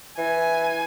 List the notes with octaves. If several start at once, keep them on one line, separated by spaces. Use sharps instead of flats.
E3 G#5